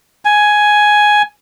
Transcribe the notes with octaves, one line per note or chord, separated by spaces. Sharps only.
G#5